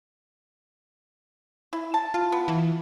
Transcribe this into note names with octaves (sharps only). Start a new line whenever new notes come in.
E4
A5
F4
B3
E3